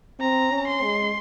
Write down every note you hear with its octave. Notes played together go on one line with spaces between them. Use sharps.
C4 A#5
C#4
C6
G#3